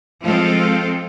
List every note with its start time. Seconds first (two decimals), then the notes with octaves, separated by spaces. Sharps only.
0.22 F3 G#3 C4 F4 A4